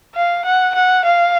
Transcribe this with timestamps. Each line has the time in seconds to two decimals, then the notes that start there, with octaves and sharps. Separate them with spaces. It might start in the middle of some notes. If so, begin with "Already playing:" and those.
0.15 F5
0.45 F#5
0.75 F#5
1.05 F5